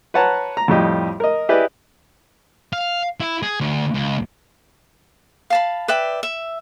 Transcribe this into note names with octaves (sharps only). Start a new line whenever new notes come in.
B4 C#5 F#5 A5 A#5
A#5
F2 A2 G3 G4 D#5
A#4 D#5
E4 G4 G#4 B4 D5 D#5
F5
E4
G#4
D2
C#2
F5 A5 B5
B4 D5 E5 G5
E5